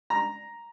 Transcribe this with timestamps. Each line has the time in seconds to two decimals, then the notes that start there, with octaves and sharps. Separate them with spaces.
0.10 A#5